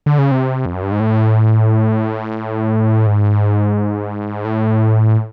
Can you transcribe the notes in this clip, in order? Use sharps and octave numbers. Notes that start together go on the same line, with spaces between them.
D3
C#3
C3
F2
F#2
G2
G#2
A2
G#2
A2